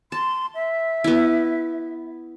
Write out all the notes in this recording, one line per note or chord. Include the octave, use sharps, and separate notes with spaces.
A5 C6
E5
B3 E4